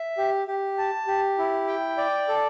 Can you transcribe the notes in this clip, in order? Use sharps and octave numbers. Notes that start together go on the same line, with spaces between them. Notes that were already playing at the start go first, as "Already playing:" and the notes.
Already playing: E5
G4
G4
A5
G4
E4
G5
D5
A4